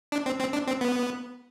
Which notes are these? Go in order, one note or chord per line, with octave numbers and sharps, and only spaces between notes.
D4
C4
C4
D4
C4
B3